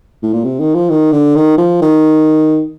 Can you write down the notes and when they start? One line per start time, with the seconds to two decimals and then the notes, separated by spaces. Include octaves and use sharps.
0.22 A2
0.33 A#2
0.44 C3
0.60 D#3
0.75 F3
0.90 D#3
1.12 D3
1.35 D#3
1.58 F3
1.81 D#3